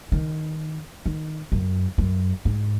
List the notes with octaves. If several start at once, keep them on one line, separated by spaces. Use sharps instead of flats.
D#3
D#3
F#2
F#2
G#2